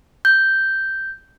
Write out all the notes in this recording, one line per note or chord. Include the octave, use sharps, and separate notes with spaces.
G6